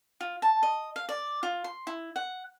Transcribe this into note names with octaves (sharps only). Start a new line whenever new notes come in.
F4
A5
D#5
F5
D5
F4
C6
E4
F#5